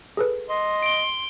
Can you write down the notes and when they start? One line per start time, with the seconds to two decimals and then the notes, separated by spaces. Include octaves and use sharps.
0.17 G#4 A4 B4
0.49 D#5 C6
0.83 D7 G7